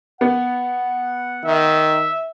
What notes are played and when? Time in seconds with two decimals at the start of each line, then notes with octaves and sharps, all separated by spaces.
0.21 B3 F#5
1.45 D#3 E5